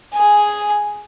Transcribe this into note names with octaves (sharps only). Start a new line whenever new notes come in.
G#4 G#5